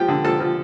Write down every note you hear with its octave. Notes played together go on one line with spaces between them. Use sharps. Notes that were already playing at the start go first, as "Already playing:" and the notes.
Already playing: F3 G4 G5
D3
F3 A4 A5
F3